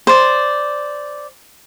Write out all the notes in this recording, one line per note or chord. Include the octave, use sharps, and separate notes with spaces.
C5 D5